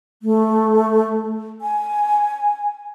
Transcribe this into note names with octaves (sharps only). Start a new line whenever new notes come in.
A3
G#5